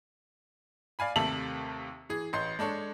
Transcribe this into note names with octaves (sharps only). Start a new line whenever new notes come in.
D5 F5 G#5 B5
D#2 C3 A3 E5 A5 F#7
E3 G#4
A1 D#5 C6 G6 C7
G#3 D4 A4 C#5